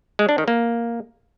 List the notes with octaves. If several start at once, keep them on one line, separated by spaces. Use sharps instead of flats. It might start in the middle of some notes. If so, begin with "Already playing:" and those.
G#3
D4
D#3
A#3